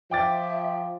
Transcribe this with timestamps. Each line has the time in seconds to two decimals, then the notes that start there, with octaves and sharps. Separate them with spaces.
0.11 F3 E5 G5 D6 A6